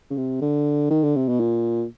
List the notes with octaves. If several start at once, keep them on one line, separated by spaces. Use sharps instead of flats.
C#3
C3
D3
D#3
D3
C3
B2
A#2